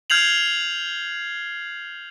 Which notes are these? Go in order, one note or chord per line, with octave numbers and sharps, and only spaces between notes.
F6 G6 G#6 C7 F7 F#7